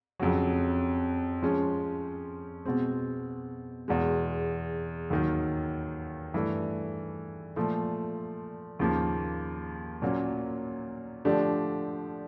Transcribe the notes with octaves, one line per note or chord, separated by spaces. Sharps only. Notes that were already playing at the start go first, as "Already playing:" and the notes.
F2 C#3 F#3
F3 G#3 C#4
B2 G#3 C4
E2 B2 G#3
D#2 D#3 F#3
G2 E3 A3
A#2 F3 A3
D#2 C#3 F3 A#3
A#2 F#3 A#3 C#4
D3 F3 A3 D4 G4